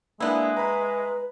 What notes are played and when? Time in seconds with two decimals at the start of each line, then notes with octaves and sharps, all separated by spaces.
0.20 G#3 A#3 B3 D4 E4
0.57 B4 A#5 B5